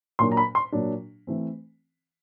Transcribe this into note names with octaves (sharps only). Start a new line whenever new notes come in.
A#2 F#3 A#3 D4 C6
A#5
B5
C6
A#2 F#3 A#3 D4
E3 A3 C4